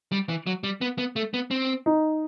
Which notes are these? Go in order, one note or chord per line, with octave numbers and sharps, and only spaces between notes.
G3
E3
F#3
G3
B3
B3
A3
B3
C4
D#4